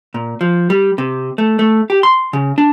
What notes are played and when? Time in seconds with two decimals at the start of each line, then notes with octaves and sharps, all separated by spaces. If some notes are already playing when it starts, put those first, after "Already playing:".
0.14 A#2
0.41 F3
0.70 G3
0.98 C3
1.38 A3
1.59 A3
1.90 G4
2.03 C6
2.33 C#3
2.58 D4